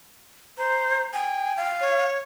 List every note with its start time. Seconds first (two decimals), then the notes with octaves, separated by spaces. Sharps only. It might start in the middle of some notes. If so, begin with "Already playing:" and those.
0.58 C5 A#5
1.13 G5 G#5
1.57 F5
1.81 C#5